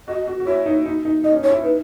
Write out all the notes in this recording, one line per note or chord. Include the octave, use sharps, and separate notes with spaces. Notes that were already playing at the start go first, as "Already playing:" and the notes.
F#4 D#5
F#4
F#4
E4 C#5
D#4
D#4
D#4
D#4 D#5
C#4
D#4
C#5
E4
D#4 B4